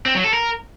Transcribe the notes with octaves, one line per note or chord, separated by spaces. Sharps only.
C4
F#3
A4
A#4